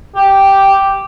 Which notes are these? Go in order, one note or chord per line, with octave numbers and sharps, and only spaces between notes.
G4